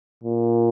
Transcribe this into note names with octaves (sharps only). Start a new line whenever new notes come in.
A#2